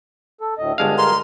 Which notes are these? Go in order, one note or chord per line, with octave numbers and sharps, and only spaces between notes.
A4
D2 A2 D#5
G1 G#3 D4 F5
A#4 C6